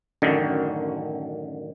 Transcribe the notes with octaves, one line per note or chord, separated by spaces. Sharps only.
A1 F#2 D3 D#3